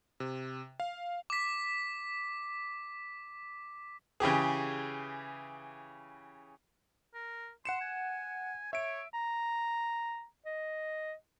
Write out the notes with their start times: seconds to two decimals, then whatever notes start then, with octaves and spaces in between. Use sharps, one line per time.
0.20 C3
0.80 F5
1.30 D6 B6
4.20 C#3 E3 G4 G#4
7.14 A#4
7.65 F#5 C6 C#7 E7
7.81 G#5
8.73 C#5 E5 D7
9.14 A#5
10.46 D#5